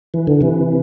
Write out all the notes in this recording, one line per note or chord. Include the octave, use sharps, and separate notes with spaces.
E3
D3
C3 E3